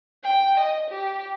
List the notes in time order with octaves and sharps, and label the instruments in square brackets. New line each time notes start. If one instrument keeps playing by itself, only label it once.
[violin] G5
D#5
G4